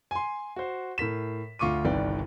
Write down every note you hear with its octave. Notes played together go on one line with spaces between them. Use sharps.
G#5 C6
F#4 C5
A2 A#4 B6 E7
D2 F4 C#6 D6 D#7
G1 C2 D#3 B4 D5 G5